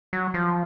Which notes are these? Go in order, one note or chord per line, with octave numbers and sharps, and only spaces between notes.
F#3
F3